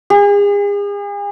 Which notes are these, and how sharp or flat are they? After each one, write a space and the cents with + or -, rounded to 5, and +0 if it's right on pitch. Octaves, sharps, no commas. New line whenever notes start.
G#4 -40